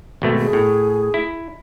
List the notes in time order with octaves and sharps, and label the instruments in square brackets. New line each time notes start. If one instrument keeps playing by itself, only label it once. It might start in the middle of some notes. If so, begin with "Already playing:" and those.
[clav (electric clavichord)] G#1 B2 A3
[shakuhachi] G#4
[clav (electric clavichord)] A2
E4